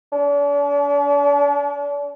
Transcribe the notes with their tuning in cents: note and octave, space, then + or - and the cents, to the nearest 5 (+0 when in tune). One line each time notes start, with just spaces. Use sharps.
D4 -45